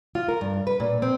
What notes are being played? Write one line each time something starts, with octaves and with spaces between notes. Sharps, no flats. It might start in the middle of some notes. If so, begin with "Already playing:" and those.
F4
A#4
G2
B4
A#2
C4